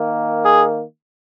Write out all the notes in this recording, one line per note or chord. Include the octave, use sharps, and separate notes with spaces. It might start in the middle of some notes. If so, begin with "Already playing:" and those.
Already playing: D#3 A#3
G#4